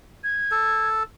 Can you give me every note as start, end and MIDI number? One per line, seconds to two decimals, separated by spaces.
0.24 0.88 92
0.51 1.03 69